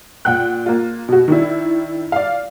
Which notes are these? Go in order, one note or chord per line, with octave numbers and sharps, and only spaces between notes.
A#2 F#5 G5 F#6
A#3 F4
B2 F#4
D#3 D4 E4
D5 F5